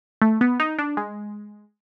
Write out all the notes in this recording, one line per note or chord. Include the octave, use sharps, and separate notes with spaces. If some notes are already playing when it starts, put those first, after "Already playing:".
A3
B3
D#4
D4
G#3